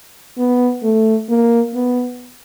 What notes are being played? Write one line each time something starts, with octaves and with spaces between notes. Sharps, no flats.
B3
A3
A#3
B3